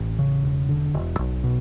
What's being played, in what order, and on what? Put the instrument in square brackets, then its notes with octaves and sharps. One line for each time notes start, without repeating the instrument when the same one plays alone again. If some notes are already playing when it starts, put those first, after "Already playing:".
Already playing: [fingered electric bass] A1
C#3
E1
D3
E1
B1
B2